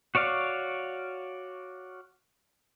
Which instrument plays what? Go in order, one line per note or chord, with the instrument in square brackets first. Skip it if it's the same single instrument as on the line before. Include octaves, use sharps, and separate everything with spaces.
[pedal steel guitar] F#4 C#5 D5 F5